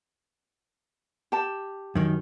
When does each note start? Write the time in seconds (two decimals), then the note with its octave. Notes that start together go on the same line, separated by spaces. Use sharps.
1.32 G4 A5
1.95 F#2 D#3